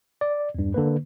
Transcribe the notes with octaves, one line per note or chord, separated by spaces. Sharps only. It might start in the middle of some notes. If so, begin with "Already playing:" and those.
D5
E2 G2
D3 A#3 B4